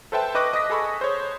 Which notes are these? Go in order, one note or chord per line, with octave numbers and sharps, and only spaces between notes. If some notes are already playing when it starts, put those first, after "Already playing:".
A4 B4 C5 E5 G5 A5
B4 D#5 C#6 D6 F#6 A#6
D#5 D6 D#6 A#6 B6
G#4 A4 B5 C#6
C5 C#5